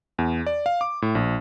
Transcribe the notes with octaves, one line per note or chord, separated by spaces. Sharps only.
E2
D5
F5
D6
A2
A#1